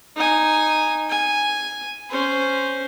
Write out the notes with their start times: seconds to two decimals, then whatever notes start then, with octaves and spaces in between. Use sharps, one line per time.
0.16 D#4 G#5
1.10 G#5
2.10 C#4 C5